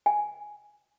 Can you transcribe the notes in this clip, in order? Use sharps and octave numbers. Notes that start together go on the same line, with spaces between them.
G#5